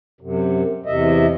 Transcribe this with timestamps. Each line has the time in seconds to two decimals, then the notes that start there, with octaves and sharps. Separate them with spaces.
0.21 F#2 C3
0.86 E2 C3 D#5 E5